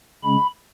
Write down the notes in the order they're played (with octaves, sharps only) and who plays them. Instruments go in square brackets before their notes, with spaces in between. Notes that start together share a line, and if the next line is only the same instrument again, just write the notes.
[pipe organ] C#3 G#3 C#4 B5